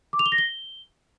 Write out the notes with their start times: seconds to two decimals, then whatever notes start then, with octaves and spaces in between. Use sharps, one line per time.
0.13 D6
0.19 F7
0.26 G7
0.32 A#6
0.38 G7